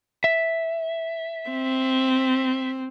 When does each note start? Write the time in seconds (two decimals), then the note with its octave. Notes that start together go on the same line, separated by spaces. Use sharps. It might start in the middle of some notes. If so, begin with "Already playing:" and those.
0.24 E5
1.50 C4